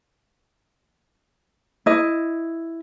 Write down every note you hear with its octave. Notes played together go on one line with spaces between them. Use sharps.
E4 D#5